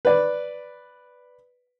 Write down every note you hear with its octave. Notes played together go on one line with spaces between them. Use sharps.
B4 D5